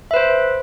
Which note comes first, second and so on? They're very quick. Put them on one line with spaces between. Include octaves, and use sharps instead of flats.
E5 B4 C5